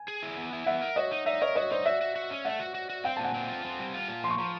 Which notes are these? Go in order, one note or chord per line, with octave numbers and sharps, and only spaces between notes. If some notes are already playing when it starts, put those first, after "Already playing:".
Already playing: G#5
G#4
E4
B3
E4
B3 E5 F#5
A#4
F#4 C#5 D#5
D#4
D#4 D5 E5
A#4 C#5 D#5
F#4 C#5 D#5
D#4 C5 D5
F#4 D5 E5
F#4
F#4
C#4
A3 E5 F#5
F#4
F#4
F#4
C4 F5 G5
A#2 A5
F#5 G#5
C4
F4
C4
G3
F4
A#2
F3 C6
C#6
F3 A#5 C6